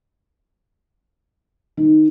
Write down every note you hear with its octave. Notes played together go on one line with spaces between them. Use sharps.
D#3